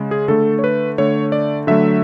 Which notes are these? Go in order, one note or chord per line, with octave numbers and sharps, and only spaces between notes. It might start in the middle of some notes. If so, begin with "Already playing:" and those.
Already playing: C#3 G#3
G#4
D3 A3 A4
C#5
B4
D3 A3 C#5
D5
D3 F#3 A3 E5